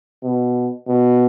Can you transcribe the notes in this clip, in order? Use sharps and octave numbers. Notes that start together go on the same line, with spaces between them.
B2
B2